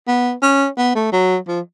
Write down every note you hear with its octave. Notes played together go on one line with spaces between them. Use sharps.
B3
C#4
B3
A3
F#3
F3